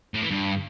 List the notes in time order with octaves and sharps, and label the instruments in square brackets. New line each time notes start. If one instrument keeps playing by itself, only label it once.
[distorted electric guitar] A2
E3
G2